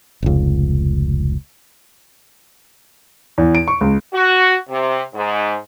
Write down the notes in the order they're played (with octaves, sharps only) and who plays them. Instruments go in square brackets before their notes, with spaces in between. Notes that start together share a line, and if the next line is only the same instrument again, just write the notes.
[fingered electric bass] F1 C#2
[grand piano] E2
D7
C#6
C#2
[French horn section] F#4
C3
G#2